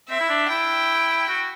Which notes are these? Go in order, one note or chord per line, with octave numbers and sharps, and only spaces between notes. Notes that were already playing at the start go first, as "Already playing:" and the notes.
C4 E5
E4
D4
E4 G5
F#4